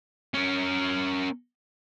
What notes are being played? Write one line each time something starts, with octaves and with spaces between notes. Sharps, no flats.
C#4 A#4